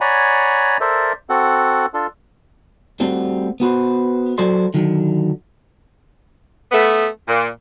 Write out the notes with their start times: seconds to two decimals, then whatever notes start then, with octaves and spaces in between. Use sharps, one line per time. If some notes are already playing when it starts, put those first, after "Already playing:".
0.01 C#5 D5 F#5 G#5 A#5 B5
0.81 A4 A#4 C5 D5 E5
1.30 C4 F#4 A4 F#5
1.94 D4 F4 A4
3.00 G3 A3 C4 F#4
3.60 B3 F#4 B4 C5
4.38 F#3 F#4 A4 C5 D5 C6
4.74 D3 D#3 F#3
6.71 A3 B3
7.28 A#2